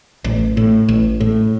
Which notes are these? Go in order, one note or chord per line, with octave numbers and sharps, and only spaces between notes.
A1
A2
A1
A2